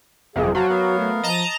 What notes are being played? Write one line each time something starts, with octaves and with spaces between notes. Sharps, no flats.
G1 F2 C3 A#3 G#4 D#5
F#3 F#4 C5 F5 A5
B3 A#4 F5
A3
F3 D#5 A5 A#5